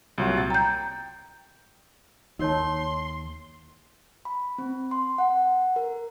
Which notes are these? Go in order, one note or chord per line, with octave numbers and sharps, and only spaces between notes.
C2 A#2 F#3
A6
G5 A#5 G6
D#2 D#4 A#4 C#5 A5 C6
B5
C4
C6
F#5
A#4